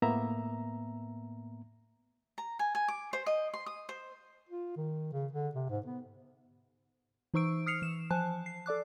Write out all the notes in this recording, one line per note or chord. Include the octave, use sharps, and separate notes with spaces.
A2 A#3 B3 E5 A#5
A#5
G#5
G#5
D6
C5
D#5
C6
D#6
C5
F4
D#3
C#3
D3
C3
G#2
B3
E3 D#4 C5 C#6 E6 D7
D#6 F6 C7 C#7 F7
E3 E7
F3 C5 G#5 A5 F#6
C7
A4 D5 D6 F#6